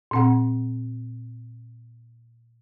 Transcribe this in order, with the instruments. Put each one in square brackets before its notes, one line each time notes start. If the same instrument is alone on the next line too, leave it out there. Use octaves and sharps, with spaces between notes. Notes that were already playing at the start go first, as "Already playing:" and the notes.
[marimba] A#2 C4 F#5